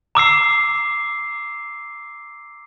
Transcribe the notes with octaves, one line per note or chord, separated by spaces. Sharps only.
A#5 D6 E6 C7